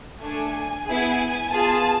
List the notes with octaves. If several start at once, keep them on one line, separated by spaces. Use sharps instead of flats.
A3 D4 A4 G#5
B3 E4 G#4 G#5
B3 F4 G#4 A5